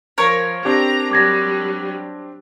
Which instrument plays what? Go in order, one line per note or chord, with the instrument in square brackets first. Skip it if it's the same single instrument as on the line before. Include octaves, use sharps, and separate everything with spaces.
[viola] F3 [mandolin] A#4 C#5
[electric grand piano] C4 D4 G4 [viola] A#5
[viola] F#3 G3 [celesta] D6 G#6 A#6